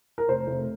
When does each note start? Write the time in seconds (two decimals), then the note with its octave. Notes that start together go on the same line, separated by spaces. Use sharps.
0.18 A#4
0.28 F1 C5
0.47 F1